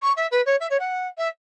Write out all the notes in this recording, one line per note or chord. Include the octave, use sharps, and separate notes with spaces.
C#6
E5
B4
C#5
E5
C#5
F#5
E5